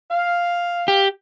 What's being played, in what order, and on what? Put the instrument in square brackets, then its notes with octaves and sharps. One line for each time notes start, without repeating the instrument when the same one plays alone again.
[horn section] F5
[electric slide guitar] G4